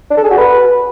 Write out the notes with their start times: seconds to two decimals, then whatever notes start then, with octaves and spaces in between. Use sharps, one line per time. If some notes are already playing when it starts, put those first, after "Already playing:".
0.10 D4
0.17 A4
0.24 G#4
0.31 F#4
0.37 B4